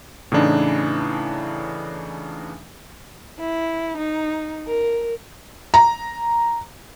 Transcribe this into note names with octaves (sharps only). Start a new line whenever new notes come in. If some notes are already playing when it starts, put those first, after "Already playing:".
A2 C#3 E3 D4 D#4
E4
D#4
A#4
A#5